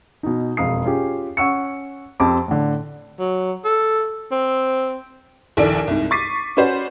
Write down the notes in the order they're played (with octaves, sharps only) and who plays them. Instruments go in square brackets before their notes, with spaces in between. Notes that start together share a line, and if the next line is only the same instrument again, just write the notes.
[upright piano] B2 D#4
E1 F2 F5 D#6 C7
C#4 F4 G4 G#4
C#4 F#5 C#6 E6 C#7
F2 C4 G4 A5 C6 D6
A2 D3
[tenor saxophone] F#3
A4
C4
[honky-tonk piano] A#1 D#2 E4 A4 D5 D7
C2 G#2
C#6 D6 A6 B6 C7 D#7
C#4 F#4 B4 C5 D5